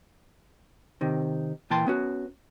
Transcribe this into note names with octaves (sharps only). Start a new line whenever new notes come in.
C3 D#3
A#2 E3 G5 A5 C6
B3 C#4 F#4